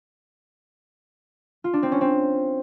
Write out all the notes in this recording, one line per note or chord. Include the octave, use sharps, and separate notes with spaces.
F4
D4
C4
C#4
C4